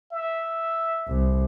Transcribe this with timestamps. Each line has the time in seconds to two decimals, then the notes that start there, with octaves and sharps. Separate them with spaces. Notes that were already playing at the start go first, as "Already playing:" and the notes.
0.13 E5
1.08 C2